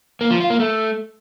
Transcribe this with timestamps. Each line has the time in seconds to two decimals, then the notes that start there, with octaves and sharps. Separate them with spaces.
0.21 A#3
0.31 F3
0.40 F4
0.50 A#3
0.60 A3